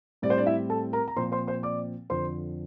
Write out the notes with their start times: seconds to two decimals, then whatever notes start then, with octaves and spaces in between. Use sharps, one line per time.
0.22 A2 G3 C4 D5
0.30 C5
0.38 D4 D5
0.46 E4 E5
0.70 A4 A5
0.93 A#4 A#5
1.08 A#5
1.16 A#2 F3 C4 C5 C6
1.32 C5 C6
1.47 C5 C6
1.63 D5 D6
2.10 F2 D3 F3 C5 C6